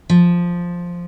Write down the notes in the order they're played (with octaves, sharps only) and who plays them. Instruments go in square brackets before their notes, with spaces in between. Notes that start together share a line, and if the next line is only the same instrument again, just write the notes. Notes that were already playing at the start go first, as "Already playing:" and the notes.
[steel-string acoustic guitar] F3